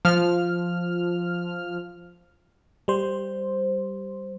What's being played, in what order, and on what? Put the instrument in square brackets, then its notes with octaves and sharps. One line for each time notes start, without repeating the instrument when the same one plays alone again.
[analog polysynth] F3 F6
[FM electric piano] G3 C5